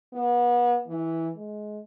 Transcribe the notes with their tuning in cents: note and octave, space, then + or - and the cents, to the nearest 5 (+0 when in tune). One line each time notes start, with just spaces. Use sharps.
B3 -35
E3 -10
G#3 +25